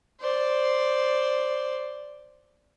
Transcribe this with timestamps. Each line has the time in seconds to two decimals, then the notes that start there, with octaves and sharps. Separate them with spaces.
0.20 C5 D5